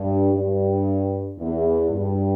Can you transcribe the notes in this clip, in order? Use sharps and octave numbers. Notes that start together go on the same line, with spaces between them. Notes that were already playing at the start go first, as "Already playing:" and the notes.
Already playing: G2
G2
E2
G2